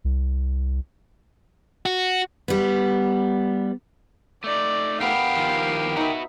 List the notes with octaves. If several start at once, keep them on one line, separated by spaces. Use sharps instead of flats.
C2
F#4
G3 B3
A3 D#4 D5
B3 G4 A#4 F5
D#3 F3
D#4 F#4 B4 E5